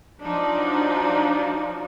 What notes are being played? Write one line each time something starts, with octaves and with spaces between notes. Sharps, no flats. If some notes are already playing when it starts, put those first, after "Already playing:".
F3 F#3 D4 D#4